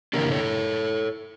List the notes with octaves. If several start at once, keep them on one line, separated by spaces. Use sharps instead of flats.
C#3 E3 A#3 D4 G4 A#4
A4 C#5